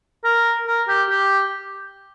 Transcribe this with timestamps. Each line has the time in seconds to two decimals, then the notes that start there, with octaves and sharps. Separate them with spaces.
0.24 A#4
0.67 A#4
0.88 G4
1.10 G4